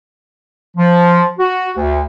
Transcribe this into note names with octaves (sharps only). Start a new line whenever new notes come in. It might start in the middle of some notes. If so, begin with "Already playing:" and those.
F3
F#4
D2